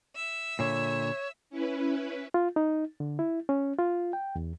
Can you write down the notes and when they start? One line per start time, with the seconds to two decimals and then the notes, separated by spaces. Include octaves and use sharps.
0.15 E5
0.59 A#2 D3 C#5
1.50 C#4 E4 B4
2.34 F4
2.56 D#4
3.00 D3
3.19 E4
3.49 C#4
3.79 F4
4.13 G5
4.36 E2